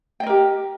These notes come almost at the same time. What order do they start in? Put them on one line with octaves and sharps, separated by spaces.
G5 D#5 A#4 G4